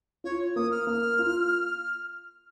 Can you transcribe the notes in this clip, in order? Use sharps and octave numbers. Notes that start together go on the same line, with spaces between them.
F4 C#5
A#3 D#6
F6
A#3
F4